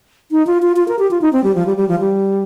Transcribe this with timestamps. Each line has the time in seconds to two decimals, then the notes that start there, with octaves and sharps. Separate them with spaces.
0.31 D#4
0.47 F4
0.62 F4
0.76 F4
0.88 A#4
0.99 G4
1.11 F4
1.22 D#4
1.33 C4
1.44 G3
1.55 F3
1.67 G3
1.77 G3
1.89 F3
2.00 G3